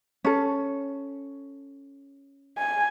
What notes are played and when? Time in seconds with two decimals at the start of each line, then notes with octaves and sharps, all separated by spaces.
0.25 C#4 A4
2.58 G#5